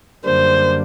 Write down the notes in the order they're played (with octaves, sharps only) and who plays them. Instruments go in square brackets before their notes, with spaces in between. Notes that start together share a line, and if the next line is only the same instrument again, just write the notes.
[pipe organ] F#2 D3 G3 A#3 D4 [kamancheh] C5